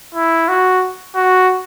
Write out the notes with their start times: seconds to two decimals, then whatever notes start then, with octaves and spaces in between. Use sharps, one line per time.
0.15 E4
0.48 F#4
1.15 F#4